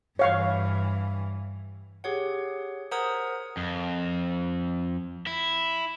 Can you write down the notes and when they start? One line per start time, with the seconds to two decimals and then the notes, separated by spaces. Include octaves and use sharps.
0.19 G2 E3 C#5 F5 C#6
2.04 G4 G#4 C#5 F#5
2.91 A#4 C5 F#5 A#5 D#6 G#6
3.57 F2
5.27 E4